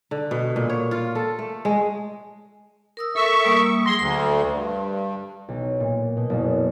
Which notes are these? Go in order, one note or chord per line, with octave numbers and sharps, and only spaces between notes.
D3
B2
A#2
C#5
F4
A4
A3
G#3
A#4 D#6 E6
A4 A#4 E5 C#6
G3 A#3 D#6
F#3 G#4 C6
D2 C6
G2
B1
A#2
B2
F#1